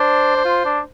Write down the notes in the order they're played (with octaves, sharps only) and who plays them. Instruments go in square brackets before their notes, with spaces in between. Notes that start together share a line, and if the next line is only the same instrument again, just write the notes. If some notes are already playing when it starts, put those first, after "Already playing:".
Already playing: [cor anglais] D4 [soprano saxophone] C5
[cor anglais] D4
F4
D4